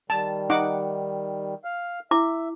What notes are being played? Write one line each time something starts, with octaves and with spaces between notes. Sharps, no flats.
D#3 G3 A5
D#4 F#5 D6
F5 F6
E4 E5 D6